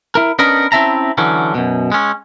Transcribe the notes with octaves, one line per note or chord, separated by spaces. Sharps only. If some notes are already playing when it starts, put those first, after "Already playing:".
E4 A#4
B3 C#4 D4 A#4 B4 D#5
C4 C#4 E4 E5 A5 A#5
D3 E3 F#3 C#4
F#2 B2
G#3 C#4